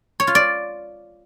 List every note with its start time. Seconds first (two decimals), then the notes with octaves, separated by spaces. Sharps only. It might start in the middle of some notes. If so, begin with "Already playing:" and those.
0.20 C#5
0.27 F4
0.35 D5